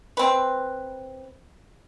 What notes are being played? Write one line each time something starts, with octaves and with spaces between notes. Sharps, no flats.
C4 B4